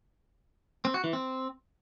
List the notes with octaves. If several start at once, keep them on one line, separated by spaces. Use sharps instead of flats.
C4
F#4
E3
C4